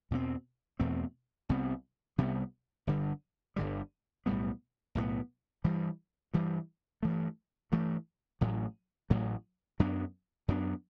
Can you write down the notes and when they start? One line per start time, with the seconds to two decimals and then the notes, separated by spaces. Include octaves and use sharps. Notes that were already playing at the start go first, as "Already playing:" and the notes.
0.11 E2 B2 A3 C4
0.80 E2 B2 A3 C4
1.49 C2 C3 G3 B3
2.18 C2 C3 G3 B3
2.87 G1 G2 D3 G3
3.56 G1 G2 D3 G3
4.26 B1 A2 G3 B3
4.95 B1 A2 G3 B3
5.64 G2 E3 G3
6.34 G2 E3 G3
7.03 G2 E3 A3
7.72 G2 E3 A3
8.41 A1 A2 F#3
9.10 A1 A2 F#3
9.80 F#2 F#3 B3 D4
10.48 F#2 F#3 B3 D4